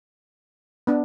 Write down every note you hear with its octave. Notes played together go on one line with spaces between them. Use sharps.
B3 D4